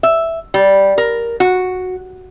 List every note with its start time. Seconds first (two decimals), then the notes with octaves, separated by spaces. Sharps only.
0.03 E5
0.54 G3
0.98 A#4
1.40 F#4